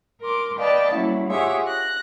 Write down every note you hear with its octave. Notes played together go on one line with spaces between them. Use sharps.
A#4 C6 D6
B4 D5 D#5 F5 G5 A5
F#3 G3 A#3 C#4 E4
F4 G4 G#4 C#5 E5 F#5
F#6 A#6